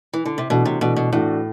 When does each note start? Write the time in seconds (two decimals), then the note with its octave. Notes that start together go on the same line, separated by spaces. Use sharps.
0.13 E3
0.25 D3
0.38 C3
0.50 B2 E3 A3 D4 F#4
0.65 C3
0.81 B2 E3 A3 D4 F#4
0.96 B2
1.12 A2 E3 A3 D4 F#4